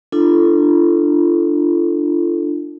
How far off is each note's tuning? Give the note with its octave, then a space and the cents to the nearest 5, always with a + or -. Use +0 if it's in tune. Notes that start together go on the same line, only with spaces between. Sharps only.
D4 +15 F4 -35 A4 +0